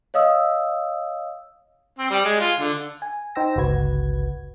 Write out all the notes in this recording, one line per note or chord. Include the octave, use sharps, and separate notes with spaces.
C#5 D#5 F5 D#6 E6
C4
G3
G#3
F4
D3
G#5
D#4 C5 G5 E6 A#6
G1 C#2 F#4 B4 G#6